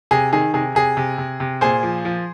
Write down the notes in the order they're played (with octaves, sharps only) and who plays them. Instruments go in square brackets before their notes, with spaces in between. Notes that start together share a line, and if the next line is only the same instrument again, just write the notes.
[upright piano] C3 G#4
D#3 G#4
C3 G#4
C3 G#4
C3
C3
C3
A#2 G#4 C5
F3
F3